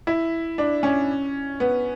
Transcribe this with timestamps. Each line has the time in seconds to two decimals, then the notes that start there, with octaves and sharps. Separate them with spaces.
0.07 E4
0.58 D4
0.83 C#4
1.60 B3